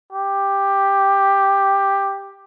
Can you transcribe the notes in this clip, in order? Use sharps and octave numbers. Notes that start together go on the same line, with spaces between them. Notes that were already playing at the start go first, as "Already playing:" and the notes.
G4